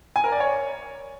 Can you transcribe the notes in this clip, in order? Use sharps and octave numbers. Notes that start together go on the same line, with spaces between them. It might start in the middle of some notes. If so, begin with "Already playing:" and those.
G#5
A#4
D5
C#5